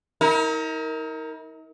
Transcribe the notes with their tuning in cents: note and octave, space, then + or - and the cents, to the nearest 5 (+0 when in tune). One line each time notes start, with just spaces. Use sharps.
D#4 +45 A#4 -5